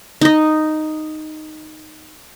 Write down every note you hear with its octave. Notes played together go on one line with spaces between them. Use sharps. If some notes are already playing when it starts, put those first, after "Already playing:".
D#4 D#5